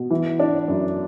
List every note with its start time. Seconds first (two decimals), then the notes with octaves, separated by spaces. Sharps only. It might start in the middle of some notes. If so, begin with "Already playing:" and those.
Already playing: B2
0.10 E3
0.40 D4
0.68 F#2